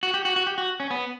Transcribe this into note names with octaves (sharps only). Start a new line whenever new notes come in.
F#4
G4
F#4
F#4
G4
F#4
C#4
B3